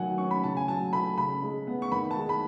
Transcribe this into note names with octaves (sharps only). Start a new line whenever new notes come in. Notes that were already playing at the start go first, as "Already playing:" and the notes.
Already playing: D#3 F#3 F#5 G#5
C#4 C#6
B5
C#3 A5
G#5
F#3 A5
A3 B5
C#3 B5
G#3
B3
C#6
D#3 B5
A5
G#3
B5